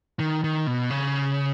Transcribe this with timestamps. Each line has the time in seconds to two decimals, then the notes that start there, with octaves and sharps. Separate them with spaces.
0.20 D#3
0.44 D#3
0.67 B2
0.90 C#3